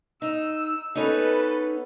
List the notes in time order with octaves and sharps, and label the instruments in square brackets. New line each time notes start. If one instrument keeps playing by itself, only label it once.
[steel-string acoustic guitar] D#4 [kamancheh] E6
[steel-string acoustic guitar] B3 C#4 D#4 [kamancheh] A4 B4